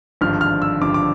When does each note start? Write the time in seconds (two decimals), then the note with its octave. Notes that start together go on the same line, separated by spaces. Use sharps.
0.21 G#1 G2 D3 F3 F6
0.41 F6
0.62 E6
0.81 G#1 G2 D3 F3 D6
0.94 D6